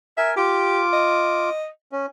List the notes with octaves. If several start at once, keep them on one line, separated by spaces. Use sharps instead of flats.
A#4 E5 G#5
F4 G4 D6
D#5
C#4